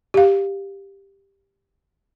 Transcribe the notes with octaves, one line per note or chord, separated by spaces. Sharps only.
G4 F5